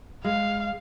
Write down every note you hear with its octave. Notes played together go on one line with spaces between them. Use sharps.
G#3 F5